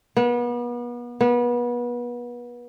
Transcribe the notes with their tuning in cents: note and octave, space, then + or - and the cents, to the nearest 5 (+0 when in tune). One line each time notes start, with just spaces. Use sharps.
B3 -35
B3 -30